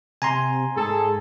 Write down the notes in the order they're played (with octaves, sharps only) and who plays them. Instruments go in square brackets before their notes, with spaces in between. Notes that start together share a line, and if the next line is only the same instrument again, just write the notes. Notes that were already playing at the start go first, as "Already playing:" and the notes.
[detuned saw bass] C3 [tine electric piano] G#5 A#5 C6
[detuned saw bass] G#2 [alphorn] G#4 [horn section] A4